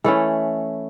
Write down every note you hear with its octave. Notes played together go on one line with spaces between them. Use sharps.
E3 A3 C#4 A4